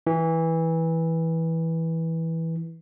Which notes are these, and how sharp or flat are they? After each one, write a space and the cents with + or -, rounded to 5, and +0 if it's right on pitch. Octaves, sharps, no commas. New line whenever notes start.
E3 -15